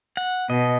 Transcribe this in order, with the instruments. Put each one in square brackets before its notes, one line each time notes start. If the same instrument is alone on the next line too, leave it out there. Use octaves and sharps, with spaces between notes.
[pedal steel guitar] F#5
[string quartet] B2 [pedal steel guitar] D#5